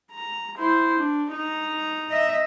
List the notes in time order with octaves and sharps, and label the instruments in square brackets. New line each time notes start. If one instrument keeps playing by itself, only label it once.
[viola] A#5
E4 C5
D4
D#4 A#5
[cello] D#5 E5